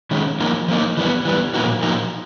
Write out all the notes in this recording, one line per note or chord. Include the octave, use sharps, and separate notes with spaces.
D#3 G#3 C#4
F3 A#3 D#4
F3 A#3 D#4
E3 G3 B3
E3 G3 B3
A#2 F3 A#3 D#4 F#4
A#2 F3 A#3 D#4 F#4